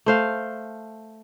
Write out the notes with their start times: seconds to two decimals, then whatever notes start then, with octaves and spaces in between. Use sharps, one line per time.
0.06 A3 C5 F5